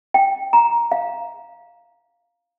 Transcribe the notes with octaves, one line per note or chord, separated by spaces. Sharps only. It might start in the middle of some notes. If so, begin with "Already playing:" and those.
G5
A#5
F5